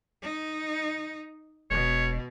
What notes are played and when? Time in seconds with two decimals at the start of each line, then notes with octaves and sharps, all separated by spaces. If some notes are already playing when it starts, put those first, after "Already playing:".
0.22 D#4
1.71 E1 B2 C#5